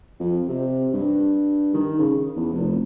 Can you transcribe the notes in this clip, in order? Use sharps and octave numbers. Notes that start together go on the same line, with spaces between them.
F2
C3
G2
D#3
C#3
E2
F1